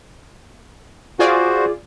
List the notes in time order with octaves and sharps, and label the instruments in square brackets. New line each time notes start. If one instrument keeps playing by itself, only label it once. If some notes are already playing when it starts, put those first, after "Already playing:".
[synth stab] F4 G#4 D5 [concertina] F#4 C5